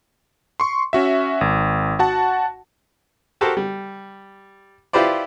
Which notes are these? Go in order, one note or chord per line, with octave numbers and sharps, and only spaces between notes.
C6 C#6
C#4 F#4 E5
G#1
F#4 F#5 A5
F#4 G4 A4 A#4 C5
G3
E4 F4 G4 B4 C5 D5